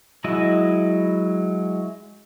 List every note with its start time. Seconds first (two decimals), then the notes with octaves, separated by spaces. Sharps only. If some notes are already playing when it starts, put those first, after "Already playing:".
0.24 F#3 G#3 E4 D#5